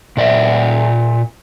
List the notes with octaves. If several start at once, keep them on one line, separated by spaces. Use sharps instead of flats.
A#2 D5 E5